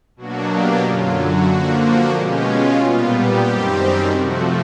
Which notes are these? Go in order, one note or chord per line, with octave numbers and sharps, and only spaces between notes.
B2 F#3 A#3 D4 F#4
G4
F#2 D3 F#3 F4
F#4
D3 F3 A#3
F#4
B2 G#3 C#4 G4
F4
A#2 G3 B3 F4
G4
F#2 D#3 G3 C4
C3 F3 A3 F#4